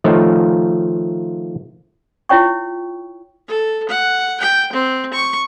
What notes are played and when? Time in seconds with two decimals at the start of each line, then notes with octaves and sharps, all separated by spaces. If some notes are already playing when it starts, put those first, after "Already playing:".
0.04 D#3 F3 A3 D#4 F4 C#5
2.29 E4 F4 C#5 G5 C#6
3.48 A4
3.89 F#5
4.40 G5
4.73 C4
5.14 C#6